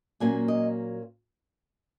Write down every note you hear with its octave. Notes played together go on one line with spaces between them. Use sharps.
A#2 F#3 A#3 C#4 G#5
D#5